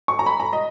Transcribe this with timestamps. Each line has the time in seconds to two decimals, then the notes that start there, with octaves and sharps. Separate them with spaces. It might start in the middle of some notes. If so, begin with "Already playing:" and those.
0.08 C#6
0.19 A#5
0.26 B5
0.40 A#5
0.53 D#5